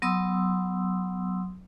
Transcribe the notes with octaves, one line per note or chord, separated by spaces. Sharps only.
F#3 B3 C6 D#6 E6